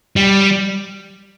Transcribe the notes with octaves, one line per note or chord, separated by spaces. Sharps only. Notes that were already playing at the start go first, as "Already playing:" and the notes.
G3